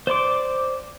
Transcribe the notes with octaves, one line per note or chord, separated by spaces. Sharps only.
C5 D5 C6 D6